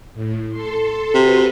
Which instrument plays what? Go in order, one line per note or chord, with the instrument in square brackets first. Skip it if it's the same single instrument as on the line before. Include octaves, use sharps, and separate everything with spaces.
[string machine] A2
A4 C6
[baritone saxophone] C3 [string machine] F#4 B4